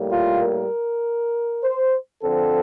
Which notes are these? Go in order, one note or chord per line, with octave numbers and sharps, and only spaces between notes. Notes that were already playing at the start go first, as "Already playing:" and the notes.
Already playing: A2 G3 A#3
F4
A#4
C5
D3 F3 C4 A4